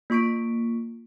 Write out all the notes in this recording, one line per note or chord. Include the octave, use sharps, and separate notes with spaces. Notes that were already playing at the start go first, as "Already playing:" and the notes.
A#3 F4 C#6 B6 D7